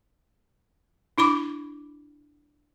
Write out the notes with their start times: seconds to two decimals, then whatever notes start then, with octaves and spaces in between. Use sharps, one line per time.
1.18 D4 E4 B5 D6